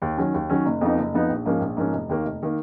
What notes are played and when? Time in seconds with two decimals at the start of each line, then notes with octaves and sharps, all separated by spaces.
0.02 D#2
0.17 D#3 F#3 C#4
0.34 D#2
0.49 D#3 F#3 C#4
0.65 F#1
0.81 F2 F3 B3 D#4
0.97 F#1
1.14 F2 F3 B3 D#4
1.29 A#1
1.45 G#2 F3 A#3 C#4
1.61 A#1
1.77 G#2 F3 A#3 C#4
1.92 F1
2.09 D#2 D#3 A#3
2.25 F1
2.43 D#3 A#3